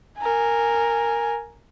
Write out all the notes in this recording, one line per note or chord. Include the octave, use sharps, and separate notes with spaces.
A#4 G#5